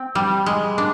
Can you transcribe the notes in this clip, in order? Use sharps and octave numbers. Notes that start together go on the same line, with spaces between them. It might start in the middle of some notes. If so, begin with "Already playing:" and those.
Already playing: C4
G3
G#3
D4